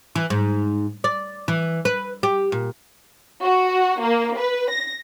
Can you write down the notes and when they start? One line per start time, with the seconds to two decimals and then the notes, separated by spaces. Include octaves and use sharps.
0.15 E3
0.30 G#2
1.04 D5
1.48 E3
1.85 B4
2.23 G4
2.52 A#2
3.42 F#4
4.01 A#3
4.37 B4
4.70 A#6